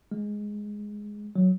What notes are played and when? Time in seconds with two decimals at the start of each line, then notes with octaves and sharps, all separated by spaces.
0.11 G#3
1.36 F#3